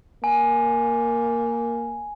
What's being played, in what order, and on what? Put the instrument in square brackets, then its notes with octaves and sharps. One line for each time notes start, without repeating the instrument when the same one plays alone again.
[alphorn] A#3 [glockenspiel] G#5